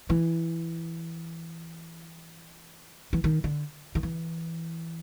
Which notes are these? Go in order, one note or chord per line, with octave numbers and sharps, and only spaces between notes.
E3
E3
D#3
D3
D#3
E3